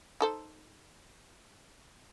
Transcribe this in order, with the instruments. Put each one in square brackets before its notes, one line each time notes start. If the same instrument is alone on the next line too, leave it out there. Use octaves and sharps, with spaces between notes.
[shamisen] D#4 A4 C5